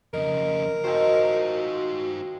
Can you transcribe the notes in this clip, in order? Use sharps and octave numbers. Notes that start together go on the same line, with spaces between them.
F2 C#3 A#4 D#5
D#3 F3 C4 D#4 F#4 C5